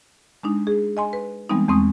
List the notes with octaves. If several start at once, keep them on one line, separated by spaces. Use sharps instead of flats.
G#3 D4 D#4
G#4
D#5 G#5 C6
B4
E3 G3 G#3 B3 C4 D#4
E2 G#3 A3 C4 C#6 D#6